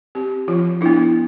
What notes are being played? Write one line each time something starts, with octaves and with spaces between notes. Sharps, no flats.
C4 G4
F3 F4
B3 D4 E4